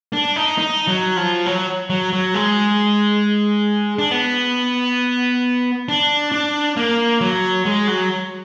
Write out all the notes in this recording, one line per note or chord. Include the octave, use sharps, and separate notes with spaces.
D4
D#4
D#4
F#3
F3
F#3
F#3
F#3
G#3
D4
B3
D4
D4
A#3
F#3
G#3
F#3